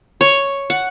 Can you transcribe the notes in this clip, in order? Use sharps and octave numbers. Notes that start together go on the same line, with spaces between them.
C#5
F#5